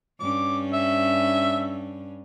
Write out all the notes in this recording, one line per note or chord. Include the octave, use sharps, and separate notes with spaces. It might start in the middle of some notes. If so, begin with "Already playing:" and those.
G2 C#4 D6
E5